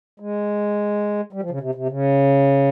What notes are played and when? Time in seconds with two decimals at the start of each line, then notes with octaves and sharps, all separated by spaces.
0.20 G#3
1.33 G3
1.42 F3
1.50 C#3
1.60 C3
1.75 C3
1.89 C#3